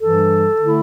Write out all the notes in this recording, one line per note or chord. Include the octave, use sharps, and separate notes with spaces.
G2 E3 G3 A4
D3 A3 E4